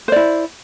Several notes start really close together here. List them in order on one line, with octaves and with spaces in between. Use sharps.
C5 D5 E4